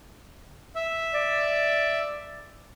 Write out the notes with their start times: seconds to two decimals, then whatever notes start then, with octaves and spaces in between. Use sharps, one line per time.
0.76 E5
1.13 D5